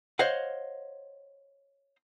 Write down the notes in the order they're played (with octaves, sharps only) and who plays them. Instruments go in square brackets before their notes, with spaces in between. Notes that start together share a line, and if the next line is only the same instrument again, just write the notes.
[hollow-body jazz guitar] C5 C#5 D#5 F5 F#5